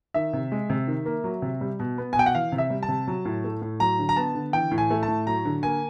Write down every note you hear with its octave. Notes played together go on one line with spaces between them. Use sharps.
D#3 E5
C3
G#3
C3
D#3
A#3
F#3
C3
G3
B2
B3
G#5
B2 G5
F#5
E3 F5
C3
E5
G3
A5
C3
F#3
A2
A3
A2
F#3 A#5
D3
A#5
B3 A5
D3
E3 G5
A2
G#5
A3
A5
A2
F#3 A#5
D3
A#3 G#5